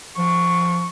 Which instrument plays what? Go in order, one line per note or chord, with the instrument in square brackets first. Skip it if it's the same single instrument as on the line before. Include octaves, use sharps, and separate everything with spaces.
[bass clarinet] F3 [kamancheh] C#6